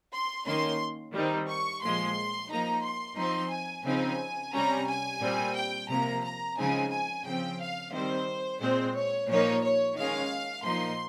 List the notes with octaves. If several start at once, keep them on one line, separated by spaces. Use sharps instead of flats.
C6
D#3 A#3 C#4 C6
D#3 G3 C4 D#4
C#6
A#2 F3 G#3 C6
F3 A#3 D#4 A#5
C6
F3 C4 D#4 C6
G#5
C#3 F3 C4 D#4 G#5
C3 G3 C#4 A#5
G#5
A#2 G3 C4
G5
C3 F3 A#3 A#5
A#5
C#3 F3 G#3 C4 D#4 G#5
G#5
C#3 F3 C4 G5
F5
D#3 G3 C4 C5
A#2 G#3 C4 C5
C#5
A#2 F3 A#3 D#4 C#5
C#5
D#3 G#3 C#4 F5
A#2 F3 A#3 D#4 C6